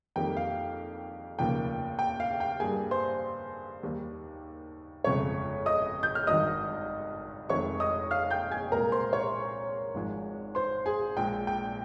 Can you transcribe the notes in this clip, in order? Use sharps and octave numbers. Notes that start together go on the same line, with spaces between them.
F2 D#3 G3 A#3 G5
F5
F1 D#2 C#3 F3 A#3 G5
G5
F5
G5
G2 G3 A#3 G#4 G#5
C5 C6
D#2 D#3 G3
G1 F2 C#3 G#3 C#5 C#6
D#5 D#6
G6
F6
G#1 G2 D#3 D#5 D#6
F1 F2 D#3 G#3 C#5 C#6
D#5 D#6
F5 F6
G5 G6
G#5 G#6
C2 A#2 G#3 A#4 A#5
C5 C6
C#5 C#6
G#1 G#2 F3 G#3
C5 C6
G#4 G#5
A#1 A#2 G#3 G5
G5